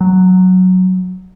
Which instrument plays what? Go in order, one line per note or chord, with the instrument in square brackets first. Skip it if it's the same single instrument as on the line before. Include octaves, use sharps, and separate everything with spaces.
[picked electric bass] F#3